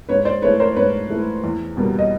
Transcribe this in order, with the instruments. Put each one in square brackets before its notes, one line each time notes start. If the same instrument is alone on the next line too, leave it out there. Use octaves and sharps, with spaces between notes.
[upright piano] G#2 B4 C#5
C5 D5
E3 A3 B4 C#5
A#4 C5
G#2 B4 C#5
E3 A3
E2
B2 G3 A#3
D#5